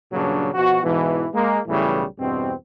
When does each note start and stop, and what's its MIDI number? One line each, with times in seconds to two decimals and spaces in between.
0.12 0.49 43
0.12 0.49 46
0.12 0.49 49
0.12 0.49 54
0.12 0.49 62
0.54 0.80 47
0.54 0.80 53
0.54 0.80 66
0.83 1.26 44
0.83 1.26 47
0.83 1.26 52
1.34 1.60 56
1.34 1.60 58
1.67 2.03 35
1.67 2.03 45
1.67 2.03 49
1.67 2.03 52
1.67 2.03 55
2.19 2.52 40
2.19 2.52 43
2.19 2.52 47
2.19 2.52 60